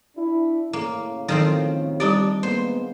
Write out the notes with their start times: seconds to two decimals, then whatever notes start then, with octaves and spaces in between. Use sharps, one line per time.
0.17 D4 E4
0.73 A2 C#3 A3 A#3
1.28 D#3 F3 F#3 C4 A4
2.00 G3 D4 D#4 G4 D5
2.43 G#3 A#3 B3 C5